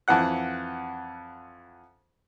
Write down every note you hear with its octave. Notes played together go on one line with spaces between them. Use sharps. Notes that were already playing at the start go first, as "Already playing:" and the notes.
F2 E3 F#5 F#6